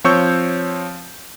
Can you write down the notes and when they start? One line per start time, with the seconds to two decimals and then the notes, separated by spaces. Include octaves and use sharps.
0.04 F3 C4 C#5 C#6 E6 G6